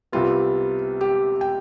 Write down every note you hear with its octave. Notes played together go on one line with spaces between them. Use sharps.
C2 C3 G3 B3 F4
G4
G5